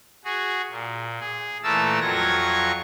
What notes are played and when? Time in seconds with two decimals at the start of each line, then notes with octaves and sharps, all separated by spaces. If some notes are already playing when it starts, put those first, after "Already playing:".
0.25 F#4 G#4
0.70 A#2
1.20 G#4
1.63 A#2 E3 A3 A#4 A5 E6
2.01 F2 F#3 F4 C#6 G#6 A#6